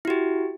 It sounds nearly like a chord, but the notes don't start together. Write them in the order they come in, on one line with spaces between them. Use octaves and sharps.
E4 F#4 G4